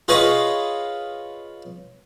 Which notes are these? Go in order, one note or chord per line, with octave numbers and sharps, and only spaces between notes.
F4 G#4 B4 C#5 D#5 F5